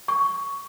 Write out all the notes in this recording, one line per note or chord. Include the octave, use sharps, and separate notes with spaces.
C#6